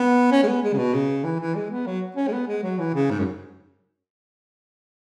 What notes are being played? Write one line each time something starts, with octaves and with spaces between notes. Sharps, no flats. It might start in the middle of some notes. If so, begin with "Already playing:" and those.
Already playing: B3
C#4
G#3
B3
G#3
C#3
B2
C#3
E3
E3
G#3
B3
F#3
C#4
G#3
B3
G#3
F#3
E3
C#3
G#2
F#2